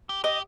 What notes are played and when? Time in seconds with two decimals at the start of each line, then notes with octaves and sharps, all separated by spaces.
0.09 G4
0.24 G4 D#5